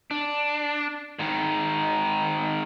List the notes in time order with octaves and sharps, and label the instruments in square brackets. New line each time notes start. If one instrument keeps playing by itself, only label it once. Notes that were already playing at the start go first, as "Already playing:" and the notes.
[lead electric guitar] D4
G#2 D#3